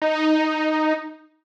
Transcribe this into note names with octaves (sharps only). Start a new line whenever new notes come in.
D#4